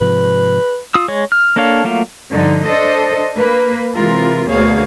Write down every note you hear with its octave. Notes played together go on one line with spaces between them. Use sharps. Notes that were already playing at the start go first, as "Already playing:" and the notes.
G#2 C3 F3 B4
F4 D#6 E6
G#3 C#5
F6
A#3 D4 A4 C#5 F5
F#3 A3 A#3 F4
G2 D3 F3 D#4
D4 A4 C5 D#5
A#3 B4
C3 E3 G#3 F4 A#4
D2 B2 A#3 G#4 C#5 F5